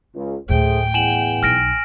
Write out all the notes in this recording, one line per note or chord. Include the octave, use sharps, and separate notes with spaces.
C#2
D2 A2 A3 G#4 C5 G5
E2 F#5 G#5 E7 F#7
B1 F6 A#6 D7